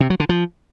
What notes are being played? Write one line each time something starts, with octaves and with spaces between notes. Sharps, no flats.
C3
F#3
D3
F3